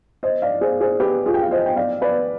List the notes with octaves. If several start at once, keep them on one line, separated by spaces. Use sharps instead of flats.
C5 D#5
D5 F5
G#4 C5
G#4 C5
G4 B4
F4 G#4
G5
F5
C5 D#5
G5
D5 F5
B4 D5